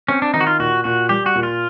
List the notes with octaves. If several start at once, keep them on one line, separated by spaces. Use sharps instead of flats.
C4 C#4
D4
D#3 D#4
F#4
F4
A#2 F#4
A#2 F#4
G3 G4
F#4
A#2
F4